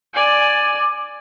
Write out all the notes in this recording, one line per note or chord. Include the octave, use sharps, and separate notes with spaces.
D5 G#5